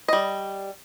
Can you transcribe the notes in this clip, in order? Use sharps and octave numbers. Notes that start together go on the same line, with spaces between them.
G3 D#5